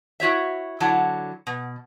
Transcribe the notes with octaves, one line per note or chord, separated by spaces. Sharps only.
E4 F#4 C#5 E5
D3 F#3 E4 F#5 A5
B2